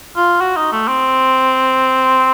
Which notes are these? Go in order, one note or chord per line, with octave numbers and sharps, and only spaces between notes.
F4
F#4
D#4
A3
C4